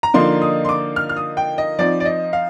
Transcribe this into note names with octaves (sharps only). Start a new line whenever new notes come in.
A#5
D3 F3 A#3 D#4 C6
D#6
C6
D6
F6
F6
D#6
G5
D#5
F3 C4 D#4 D5
D5
D#5
F5